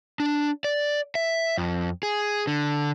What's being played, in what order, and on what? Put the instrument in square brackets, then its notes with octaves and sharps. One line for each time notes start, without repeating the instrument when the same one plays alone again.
[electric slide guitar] D4
D5
E5
F2
G#4
D3